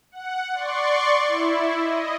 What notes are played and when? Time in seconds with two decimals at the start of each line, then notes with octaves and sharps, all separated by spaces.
0.12 F#5
0.53 D5 C6 C#6
1.27 E4
1.81 D#5